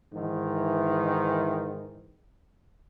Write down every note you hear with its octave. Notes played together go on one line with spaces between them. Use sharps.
G#2 D#3 E3